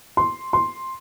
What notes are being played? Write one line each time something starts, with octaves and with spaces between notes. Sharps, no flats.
C6
C6